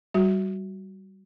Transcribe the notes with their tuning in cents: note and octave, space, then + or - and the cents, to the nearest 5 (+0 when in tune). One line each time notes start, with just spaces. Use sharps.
G3 -25 F#4 +0